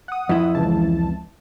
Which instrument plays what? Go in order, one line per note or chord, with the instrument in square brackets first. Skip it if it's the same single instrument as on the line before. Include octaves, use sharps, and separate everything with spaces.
[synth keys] F#5 D#6
[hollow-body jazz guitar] F2 E4
[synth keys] C#2 E3 A5